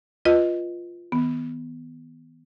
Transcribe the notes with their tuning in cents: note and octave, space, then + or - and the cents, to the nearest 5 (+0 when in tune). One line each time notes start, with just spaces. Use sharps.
F4 +0 B4 +0 D#5 +0
D#3 +45 B3 +0